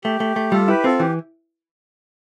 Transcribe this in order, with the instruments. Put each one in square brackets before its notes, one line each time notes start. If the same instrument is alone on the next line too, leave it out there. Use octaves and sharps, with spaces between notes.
[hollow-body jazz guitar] A3 [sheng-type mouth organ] G4
[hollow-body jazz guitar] A3
A3
[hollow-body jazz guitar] G3 [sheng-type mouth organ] F4 A4
[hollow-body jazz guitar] E4 [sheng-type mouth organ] G4 B4
[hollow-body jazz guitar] C4 [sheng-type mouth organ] F4 A4
[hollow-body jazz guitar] E3 [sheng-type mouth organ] G4